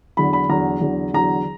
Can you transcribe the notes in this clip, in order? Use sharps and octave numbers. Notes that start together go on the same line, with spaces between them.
E2 D3 F#3 B5
B5
E2 D3 F#3 A#5
E2 D3 F#3
E2 D3 F#3 A#5